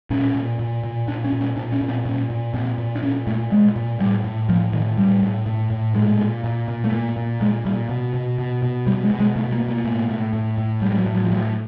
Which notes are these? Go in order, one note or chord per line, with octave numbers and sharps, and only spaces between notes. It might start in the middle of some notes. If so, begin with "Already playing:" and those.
A#2 C#4
A#2
A#2
A#2
A#2 D4
C#4
A#2
C#4
A#2 D4
C#4
A#2
C4
A#2 C#4
A#2
A#2 C4
A#2
D4
A#2 C#4
A#2 A3
A#2 G#3
A#2
A2 G3
A2
A2 F3
A2 D#3
A2 G3
A2
A2
A2
A#2 G#3
A#2
A#2
A#2
A3
A#2 A#3
A#2
A#2 G#3
A#2 G3
B2
B2
B2
B2
B2 G3
G#3
B2
G#3
B2 A3
A#3
B2
A#3
A2
A2
A2
A2
A2 G3
G3
F#3
A2
F#3
F3
A2 F#3